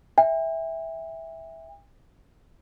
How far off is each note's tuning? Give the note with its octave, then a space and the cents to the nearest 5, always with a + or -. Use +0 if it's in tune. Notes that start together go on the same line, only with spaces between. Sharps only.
E5 -10 G5 +45